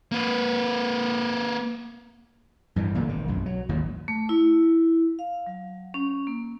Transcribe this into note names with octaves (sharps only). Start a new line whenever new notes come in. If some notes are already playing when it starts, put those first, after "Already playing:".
A#3 B4
G2 E3 G3
B1 A#2 D3 A3
G#1 D#3
B1 F#2
F#3
G#1 D#2 A#2
A3
E4
F5
F#3
C#4
A#3